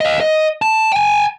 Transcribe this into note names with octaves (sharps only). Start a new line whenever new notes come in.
D#5 F5
D#5
A5
G5 G#5